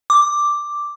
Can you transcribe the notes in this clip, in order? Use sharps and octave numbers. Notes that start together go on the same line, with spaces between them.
D6